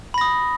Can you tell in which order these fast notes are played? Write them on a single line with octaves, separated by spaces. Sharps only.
B5 A#6 D#6